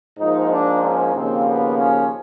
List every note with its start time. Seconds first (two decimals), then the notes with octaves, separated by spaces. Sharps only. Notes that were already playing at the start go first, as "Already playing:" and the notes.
0.19 G#2 F3 A#3 D#4
0.51 D4
0.82 C#4
1.14 D#2 C#3 F3 A#3 C4
1.46 B3
1.77 C#4